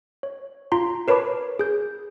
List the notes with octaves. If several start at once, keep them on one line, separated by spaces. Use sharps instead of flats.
C#5
F4 A#5 C6
A#4 B4 C#5 A5 B5 D6
G#4 G6